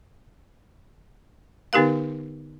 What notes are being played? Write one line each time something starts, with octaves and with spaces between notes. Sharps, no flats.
D3 B3 D#4 G4 A#4 F5